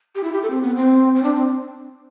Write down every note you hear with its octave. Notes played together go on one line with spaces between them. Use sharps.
G4
E4
G4
A4
C4
B3
C4
C4
D4
C4